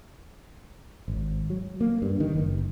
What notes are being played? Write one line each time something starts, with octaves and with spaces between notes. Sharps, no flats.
G#1
F#3
A#3
G2
D#3
F#1